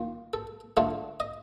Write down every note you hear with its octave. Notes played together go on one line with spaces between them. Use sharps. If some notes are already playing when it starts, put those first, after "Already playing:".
Already playing: D#3 A#3 F4
A4
D3 A3 D4 F4 A4
D#5